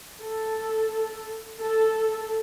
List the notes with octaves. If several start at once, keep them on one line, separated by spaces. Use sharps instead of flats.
A4
A4